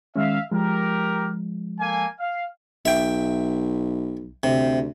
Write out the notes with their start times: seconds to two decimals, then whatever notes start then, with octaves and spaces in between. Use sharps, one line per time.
0.16 D#3 G#3 C#4 E5 F5
0.52 F3 G#3 G4 A#4
1.79 A#3 A4 G#5
2.19 F5
2.85 B1 E5 G5
4.43 D2 C3